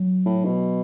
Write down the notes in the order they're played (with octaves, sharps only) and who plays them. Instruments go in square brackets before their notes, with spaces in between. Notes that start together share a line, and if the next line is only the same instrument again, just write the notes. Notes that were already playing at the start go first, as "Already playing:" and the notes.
Already playing: [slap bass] F#3
[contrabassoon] A2
B2